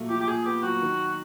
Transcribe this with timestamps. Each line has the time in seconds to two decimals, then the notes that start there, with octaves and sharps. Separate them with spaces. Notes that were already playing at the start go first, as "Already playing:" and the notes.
Already playing: A#2 F#3 A3
0.09 F3 G4
0.20 G4
0.27 A#2 G#4
0.45 B3 G4
0.63 F#3 F#4
0.82 D#3